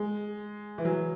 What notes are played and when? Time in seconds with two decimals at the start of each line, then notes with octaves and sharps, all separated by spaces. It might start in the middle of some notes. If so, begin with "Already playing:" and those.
Already playing: G#3
0.78 E3
0.85 F#3